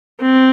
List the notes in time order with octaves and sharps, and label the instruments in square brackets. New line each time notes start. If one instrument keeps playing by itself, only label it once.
[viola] C4